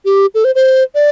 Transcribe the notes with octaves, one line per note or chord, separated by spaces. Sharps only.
G4
A4
C5
C5
D5